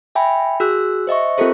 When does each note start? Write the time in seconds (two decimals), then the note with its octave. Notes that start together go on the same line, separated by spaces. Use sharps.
0.15 E5 G5 G#5 B5
0.60 F#4 G#4 E6 F#6
1.07 C5 D#5 E5 C#6
1.38 C4 F4 G4 A4 A#4 C5